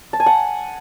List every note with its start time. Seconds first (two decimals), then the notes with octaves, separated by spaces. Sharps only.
0.13 A5
0.20 G#5
0.26 F#5